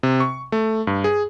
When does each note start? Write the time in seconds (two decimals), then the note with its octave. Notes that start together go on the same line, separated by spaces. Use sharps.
0.03 C3
0.20 C#6
0.52 A3
0.87 G2
1.04 G#4